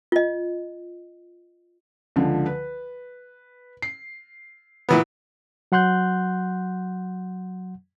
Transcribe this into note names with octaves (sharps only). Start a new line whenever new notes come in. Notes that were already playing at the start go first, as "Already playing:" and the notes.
F4 D#5
C#2 D3 F3
B4
C7
A#2 E3 B3
F#3 F#5 C6 F#6 G6